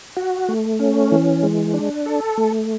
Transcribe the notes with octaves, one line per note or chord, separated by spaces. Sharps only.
F#4
A3
C#4
E3
G#3
D4
A4
A3